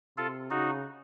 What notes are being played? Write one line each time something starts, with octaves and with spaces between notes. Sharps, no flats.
C3 F4 A4
C#3 D#4 F#4